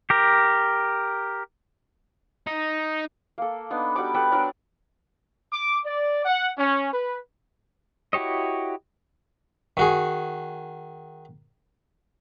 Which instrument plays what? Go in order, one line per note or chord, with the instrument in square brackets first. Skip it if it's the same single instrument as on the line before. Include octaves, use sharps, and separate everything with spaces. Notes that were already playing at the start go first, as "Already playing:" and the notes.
[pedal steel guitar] G4 A#4
[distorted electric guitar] D#4
[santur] A#3 A4
B3 D4 D#4
G3 F#4 B5 D6
A4 B4 G5 D6
F#3 D4 A#4 D5
[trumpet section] D6
D5
F#5
C#4
B4
[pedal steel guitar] E4 F#4 G4 C#5 D#5
[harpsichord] D#3 F#4 G#4